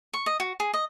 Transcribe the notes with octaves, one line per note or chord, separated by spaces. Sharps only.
C#6
D#5
F#4
G#4
D#5